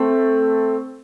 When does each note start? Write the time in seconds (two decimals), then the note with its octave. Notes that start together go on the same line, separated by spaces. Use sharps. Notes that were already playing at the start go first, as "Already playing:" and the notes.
Already playing: A3 C4